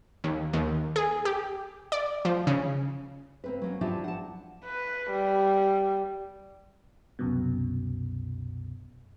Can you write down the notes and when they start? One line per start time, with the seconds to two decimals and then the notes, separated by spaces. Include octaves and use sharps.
0.24 D#2
0.53 D#2
0.96 G#4
1.25 G4
1.92 D5
2.25 F3
2.47 C#3
3.44 A#3 C4 B4
3.62 F#3 A#3 C#4
3.81 F3 F#3 D4 E4 F4 G4
4.04 F#5 A5
4.64 B4
5.11 G3
7.19 C2 F#2 B2